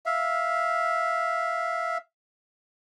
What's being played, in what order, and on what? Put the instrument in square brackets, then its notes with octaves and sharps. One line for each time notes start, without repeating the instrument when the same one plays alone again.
[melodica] E5 F5